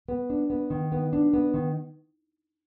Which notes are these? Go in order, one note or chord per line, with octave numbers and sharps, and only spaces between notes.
B3
D4
B3
D#3
B3
D4
B3
D#3